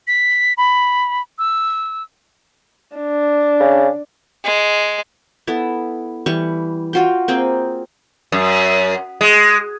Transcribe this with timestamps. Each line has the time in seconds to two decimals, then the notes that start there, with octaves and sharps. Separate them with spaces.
0.07 B6
0.58 B5
1.39 E6
2.97 D4
3.60 C#3
4.44 G#3
5.47 B3 E4 A4
6.26 E3 G3 C#6
6.93 F4 F#4 G5
7.28 A#3 C4 G#4 G5
8.32 F#2
9.21 G#3